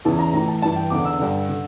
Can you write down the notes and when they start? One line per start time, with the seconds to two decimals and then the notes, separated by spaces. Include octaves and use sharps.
0.05 E2 C#3 E3 A5
0.19 A#5
0.33 A2 E3 A#5
0.48 A5
0.62 G2 E3 A5
0.76 G5
0.90 E2 D3 D6
1.05 E6
1.19 G2 D3
1.49 D3